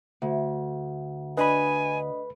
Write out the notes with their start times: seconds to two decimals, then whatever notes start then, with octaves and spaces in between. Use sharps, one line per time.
0.22 D2
1.38 D4 B4 D#5 G#5 B5